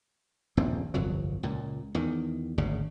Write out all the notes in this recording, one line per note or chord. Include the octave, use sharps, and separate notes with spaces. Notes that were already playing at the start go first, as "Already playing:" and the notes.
D#1 A#1 G2 C4
G1 C2 F2 F#3
C#2 A#2
E2 D#3
G#1 D2 C#3